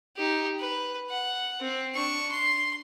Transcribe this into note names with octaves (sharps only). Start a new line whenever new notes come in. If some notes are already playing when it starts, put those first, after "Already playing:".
D#4 G4
B4
F#5
C4
D4 C#6
C6